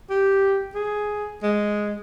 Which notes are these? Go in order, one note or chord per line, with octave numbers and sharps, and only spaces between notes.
G4
G#4
G#3